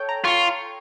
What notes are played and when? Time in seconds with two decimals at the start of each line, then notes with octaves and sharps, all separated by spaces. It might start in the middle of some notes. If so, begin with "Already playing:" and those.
Already playing: A4 C#5 G5
0.09 A#5
0.24 F4 C#6